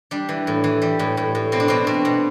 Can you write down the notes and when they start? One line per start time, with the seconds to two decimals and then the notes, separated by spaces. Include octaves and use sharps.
0.11 G3 D4
0.29 E3
0.47 A2
0.64 E3
0.82 G3
0.99 A2
1.17 A2
1.35 A2
1.52 B2 C4
1.60 D4
1.68 B2 C4
1.87 B2
2.05 B2